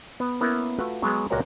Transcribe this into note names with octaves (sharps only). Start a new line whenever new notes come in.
B3
A#3 B3 C#4 E4 A#4
A3 F4 F#4 B4
F#3 G#3 B3 G#4
C#2 A#2 F#4 A#4 C#5 A#5